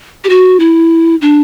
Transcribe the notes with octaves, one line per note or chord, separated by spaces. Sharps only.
G4
F#4
E4
D4